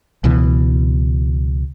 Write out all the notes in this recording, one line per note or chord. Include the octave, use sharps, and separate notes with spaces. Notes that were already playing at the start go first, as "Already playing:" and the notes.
C#2 B2 E3